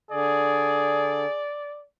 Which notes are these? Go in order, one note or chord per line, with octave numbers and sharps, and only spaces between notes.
D3 G#4 D5